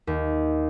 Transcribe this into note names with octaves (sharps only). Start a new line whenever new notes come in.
D#2